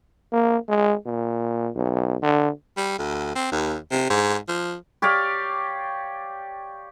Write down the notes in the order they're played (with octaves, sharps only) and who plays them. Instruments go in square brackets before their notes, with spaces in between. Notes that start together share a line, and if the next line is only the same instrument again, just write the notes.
[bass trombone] A#3
G#3
A#2
B1
D3
[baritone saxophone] G3
D2
C4
D#2
C3
G#2
F3
[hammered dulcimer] G4 C#5 D5 F5